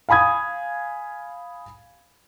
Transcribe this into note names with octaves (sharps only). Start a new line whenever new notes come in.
F5 G#5 B5 D#6 G#6